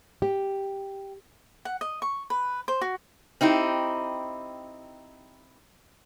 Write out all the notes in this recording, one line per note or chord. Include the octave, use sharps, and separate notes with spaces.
G4
F#5
D#5
C#6
B4
C5
F#4
C4 D#4 E4 G4